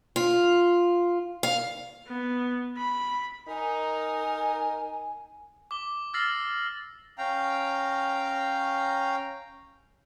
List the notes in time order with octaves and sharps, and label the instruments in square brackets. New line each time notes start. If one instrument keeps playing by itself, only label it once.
[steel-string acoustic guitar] F4
F5
[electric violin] B3
B5
[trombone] D#4 [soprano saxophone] A#4 [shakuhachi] G#5
[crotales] D6 G7
E6 F6 A6 A#6 C7 F#7
[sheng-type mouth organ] C#4 F5 G5 A#5